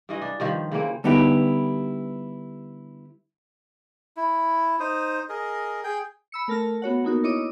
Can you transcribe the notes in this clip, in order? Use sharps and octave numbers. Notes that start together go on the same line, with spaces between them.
G2 E3 D#5
D4
G2 D#3 F3
C#3 E3 A#3 C4
D3 G3 B3 D#4 E4 G4
E4
D#4 C5 D#6
G#4 A#4 D#5
G#4 G5
B5 E6 C#7
A3 A#4 A5 F6 A#6
B3 F#4 C#5 F#5
A#3 B3 D#4 F#4 A#4
E4 C#5 D#5 D6 D#6